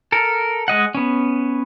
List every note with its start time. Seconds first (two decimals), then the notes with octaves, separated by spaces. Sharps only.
0.12 A4 A#4
0.68 G#3 D#5 F#5
0.95 B3 C#4